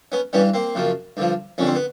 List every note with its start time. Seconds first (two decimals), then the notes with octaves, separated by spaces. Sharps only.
0.12 B3 C#4
0.33 G2 E3 G3 B3 C#4
0.54 A#3 C4
0.75 F#2 C#3 F3
1.17 G2 D3 F3
1.58 F2 D3 G3 C#4
1.67 C4
1.75 B3